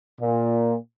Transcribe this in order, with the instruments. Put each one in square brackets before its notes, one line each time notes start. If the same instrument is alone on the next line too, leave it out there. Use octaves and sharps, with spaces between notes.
[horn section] A#2